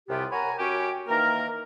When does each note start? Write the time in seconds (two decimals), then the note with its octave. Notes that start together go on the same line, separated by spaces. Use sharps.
0.09 C2 F#2 C3 B3 F4 G4
0.32 A#4 C#5 F#5 G#5 A#5 B5
0.59 F#2 C#4 F#4 G4 C#5 G5
1.08 D#3 E3 A#3 A#4